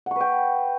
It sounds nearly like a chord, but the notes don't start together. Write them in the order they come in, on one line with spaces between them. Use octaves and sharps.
F#5 C#6 B4 G5